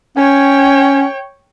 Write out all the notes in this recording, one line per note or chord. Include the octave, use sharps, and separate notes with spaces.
C#4 C#5 G5